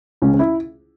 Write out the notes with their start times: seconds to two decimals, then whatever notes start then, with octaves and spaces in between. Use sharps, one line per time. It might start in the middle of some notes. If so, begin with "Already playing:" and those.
0.22 C#2 C#4
0.34 C#4
0.39 E4